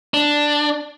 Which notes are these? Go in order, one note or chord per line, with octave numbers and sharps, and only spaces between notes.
D4